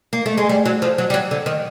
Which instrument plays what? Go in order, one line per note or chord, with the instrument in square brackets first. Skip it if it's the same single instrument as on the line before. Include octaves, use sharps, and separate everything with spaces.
[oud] A#3
A3
G#3
G3
F#3
F3
F#3
G3
F#3
D3
D#3